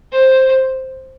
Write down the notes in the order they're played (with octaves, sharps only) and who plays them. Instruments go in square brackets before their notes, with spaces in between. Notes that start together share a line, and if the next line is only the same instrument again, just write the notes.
[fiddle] C5